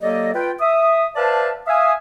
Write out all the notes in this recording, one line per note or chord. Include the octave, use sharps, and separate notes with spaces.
F#3 A#3 G4 A4 D5 D#5
F4 B4 G5
E5 D#6
B4 C5 D5 E5 F5 A5
E5 F5 G#5 D#6